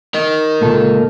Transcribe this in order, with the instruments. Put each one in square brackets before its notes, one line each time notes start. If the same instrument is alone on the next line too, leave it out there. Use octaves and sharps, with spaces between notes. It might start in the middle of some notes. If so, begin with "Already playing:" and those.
[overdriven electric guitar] A#4 D#5
[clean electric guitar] C#2 A#2 A4